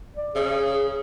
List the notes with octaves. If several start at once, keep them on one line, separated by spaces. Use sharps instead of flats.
D5
C#3 G#4